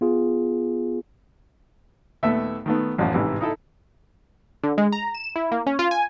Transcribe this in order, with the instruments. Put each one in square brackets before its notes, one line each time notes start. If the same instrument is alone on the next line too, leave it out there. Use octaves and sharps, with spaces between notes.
[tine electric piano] B3 F4 G#4
[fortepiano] D#2 A#2 A3 B3 E5
D#3 A3 B3
A1 F#2 F3
A1 G#2 C3 E3
D#4 E4 A4
[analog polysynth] D3
G#3
A#5
E7
E4
A#3
C#4
F4
G#5